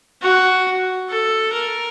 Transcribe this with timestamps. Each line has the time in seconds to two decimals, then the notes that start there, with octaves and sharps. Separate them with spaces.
0.21 F#4
1.09 A4
1.53 A#4